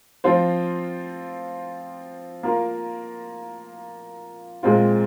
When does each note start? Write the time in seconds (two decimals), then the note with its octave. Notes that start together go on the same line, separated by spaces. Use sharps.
0.24 F3 C4 F4 C5
2.43 A#3 F4 A#4
4.63 A#2 G#3 C4 F4